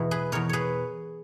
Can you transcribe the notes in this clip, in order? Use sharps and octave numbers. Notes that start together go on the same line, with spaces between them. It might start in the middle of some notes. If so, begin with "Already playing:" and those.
Already playing: E2 B2 E4
G#4 B4
E2 B2 A#4 C#5
G#4 B4 C#5